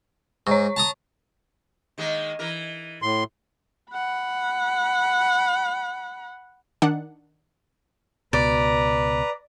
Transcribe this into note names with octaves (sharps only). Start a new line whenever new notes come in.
G#2 C#5 C#6
A5 A#5 D#6
D#3 G#3 A#3
E3 A#4
A2 C6
F#5 B5
D#3 D4 F#5
C#2 B2 B4 D5 A#5